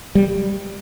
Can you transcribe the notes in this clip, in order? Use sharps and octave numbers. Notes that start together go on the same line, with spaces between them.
G3